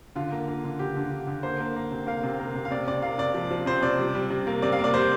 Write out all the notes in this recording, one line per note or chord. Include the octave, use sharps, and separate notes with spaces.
D3 F4
A#3
A#3
D3
D3 G4
D3
D3
D3
A#3 C5
A#3
A#3
C3
A#3 F5
C3
A#3
C3
F5
C3 D5
C3 D5
A#3 F5
C3 D5
F3
F3
C3 C5
C3 D5
G3
G3
C3
A#3
C3 D5
F5
A#3
D5
G3 C5